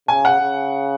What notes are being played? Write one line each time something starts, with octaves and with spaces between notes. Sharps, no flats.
C#3 G#5
F#5
C#3